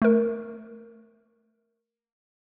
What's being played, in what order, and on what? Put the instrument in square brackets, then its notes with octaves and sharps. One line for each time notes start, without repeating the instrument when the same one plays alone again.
[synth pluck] A3 A#4